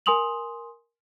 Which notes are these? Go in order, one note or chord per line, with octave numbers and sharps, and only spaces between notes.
A#4 G#5 C6 D#6 F7 F#7